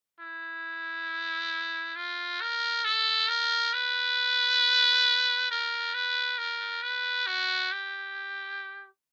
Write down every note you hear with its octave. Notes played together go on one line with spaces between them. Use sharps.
E4
F4
A#4
A4
A#4
B4
A#4
B4
A#4
B4
F#4
G4